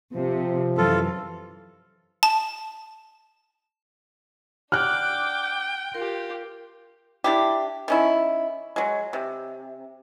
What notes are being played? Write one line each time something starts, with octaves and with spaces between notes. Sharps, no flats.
C3 F3
F#2 E3 F4 A4
A5
D4 F#5 G5 D6 F6 F#6
F4 G4 A#4
D4 E4 G4
D#3 C#4 E4
F#3 G#3
C3